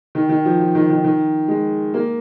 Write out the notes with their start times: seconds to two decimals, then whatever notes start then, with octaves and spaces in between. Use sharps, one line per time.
0.15 D#3
0.29 D#3
0.45 F3
0.60 F3
0.75 D#3
0.90 D#3
1.04 D#3
1.48 G#3
1.94 A#3